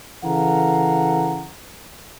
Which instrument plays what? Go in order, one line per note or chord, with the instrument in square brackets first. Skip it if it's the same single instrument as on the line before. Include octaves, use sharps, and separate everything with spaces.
[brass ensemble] C#3 E3 A4 F5 F#5 A#5